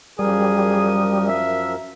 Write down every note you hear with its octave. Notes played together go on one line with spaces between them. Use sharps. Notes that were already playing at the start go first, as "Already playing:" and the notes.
F#2 F3 G3 G#4 A#4 D#6
E5